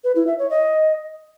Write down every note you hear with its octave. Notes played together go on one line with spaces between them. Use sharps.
B4
E4
E5
C#5
D#5